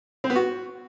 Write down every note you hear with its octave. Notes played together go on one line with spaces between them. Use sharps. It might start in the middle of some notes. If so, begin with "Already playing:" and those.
C4
B3
F#4